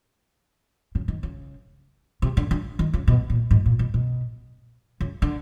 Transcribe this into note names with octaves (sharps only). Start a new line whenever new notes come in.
C#3
D#3
C#3
C3
D3
D3
D#3
C#3
B2
A#2
G#2
A#2
B2
B2
C#3
D3